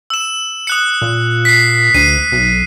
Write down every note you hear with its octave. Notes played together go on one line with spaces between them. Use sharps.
E6 E7
D#6 F#6 C#7
A#2
B6 C7
D2 C7 D#7
B1